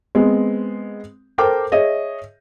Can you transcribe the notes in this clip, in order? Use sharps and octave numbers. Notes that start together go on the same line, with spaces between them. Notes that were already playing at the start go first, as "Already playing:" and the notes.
G#3 B3 C4
A4 A#4 C5 G5 D6
G#4 C#5 D#5 E5